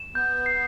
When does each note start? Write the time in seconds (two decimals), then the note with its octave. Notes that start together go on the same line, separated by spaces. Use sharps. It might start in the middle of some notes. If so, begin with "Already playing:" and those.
Already playing: E7
0.14 B3 G6
0.46 C7